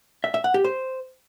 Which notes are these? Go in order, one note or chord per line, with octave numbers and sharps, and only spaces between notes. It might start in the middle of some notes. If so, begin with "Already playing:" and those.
E5
E5
F#5
G4
C5